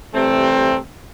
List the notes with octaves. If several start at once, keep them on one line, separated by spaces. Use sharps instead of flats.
C3 E3 G3 A3 C4